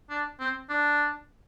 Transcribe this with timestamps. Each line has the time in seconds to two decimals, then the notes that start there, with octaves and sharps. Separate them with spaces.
0.10 D4
0.40 C4
0.70 D4